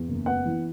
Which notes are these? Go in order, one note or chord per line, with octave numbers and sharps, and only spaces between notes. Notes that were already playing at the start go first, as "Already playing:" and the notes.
Already playing: E2
F#1
B3 F#5
E3